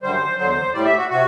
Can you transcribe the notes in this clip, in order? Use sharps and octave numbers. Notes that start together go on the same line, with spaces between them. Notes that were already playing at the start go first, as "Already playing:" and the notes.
F#2 D3 G3 C5
E2 D3 F#3 C5
A2 G3 D5
E5
F#4
C3 F#4